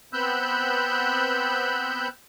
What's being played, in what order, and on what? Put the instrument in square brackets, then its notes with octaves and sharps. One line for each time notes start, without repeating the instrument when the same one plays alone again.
[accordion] B3 C4 B5 E6 F#6 G6